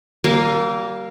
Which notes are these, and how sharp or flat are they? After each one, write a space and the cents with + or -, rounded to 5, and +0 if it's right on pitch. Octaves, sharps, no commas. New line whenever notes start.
G3 -35 A#3 +0